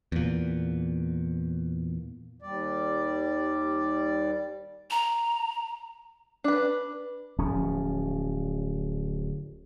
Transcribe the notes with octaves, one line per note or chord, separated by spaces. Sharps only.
E2 A#2
D#2 G3 D5
A#5
D4 B4
D1 F3 C#4